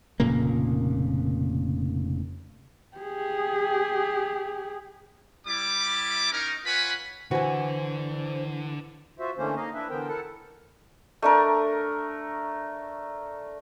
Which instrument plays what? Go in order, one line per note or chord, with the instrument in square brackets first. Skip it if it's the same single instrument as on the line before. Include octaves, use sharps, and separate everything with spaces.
[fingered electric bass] F1 A#2 C#3 A#3
[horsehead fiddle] G4 G#4
[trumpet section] G3 E4 D6
C#4 D#4 A#4
F4 B4 C#5 F#5 G#5 B5
[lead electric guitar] D3 [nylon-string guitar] E3 [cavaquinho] F#4 G#5 [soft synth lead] C5
[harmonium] F4 F#4 C5 E5
D3 E3 A3 A#3 C#4 C5
A#3 D#4 D#5 F5
D4 E4 B4 E5
D3 E3 B3 A#4 C5 G5
E4 A4 A#4 F#5 A5
[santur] A3 D4 A#4